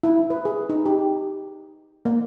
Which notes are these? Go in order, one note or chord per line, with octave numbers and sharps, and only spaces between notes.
E4
B4
G#4
D#4
G4
A#3